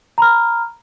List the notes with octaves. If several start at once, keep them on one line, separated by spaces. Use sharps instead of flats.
A#5 B5 F6